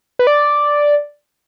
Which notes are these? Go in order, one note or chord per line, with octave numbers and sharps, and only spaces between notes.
B4
D5